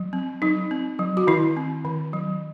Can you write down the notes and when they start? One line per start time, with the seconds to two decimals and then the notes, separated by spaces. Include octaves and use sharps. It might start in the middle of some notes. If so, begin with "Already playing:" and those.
Already playing: F#3
0.13 C4
0.42 F#3 D#4
0.71 C4
0.99 F#3
1.17 F#4
1.27 D#3 E4
1.57 C4
1.85 D#3
2.13 F#3